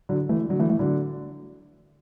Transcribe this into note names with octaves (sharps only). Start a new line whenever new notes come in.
D3 F#3
E3 A3
D3 F#3
E3 A3
E3 A3
D3 F#3